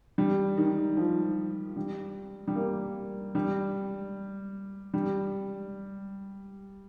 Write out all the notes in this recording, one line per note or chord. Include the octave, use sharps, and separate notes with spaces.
G3
D#3
F3
G3
G3
A#3
G3
G3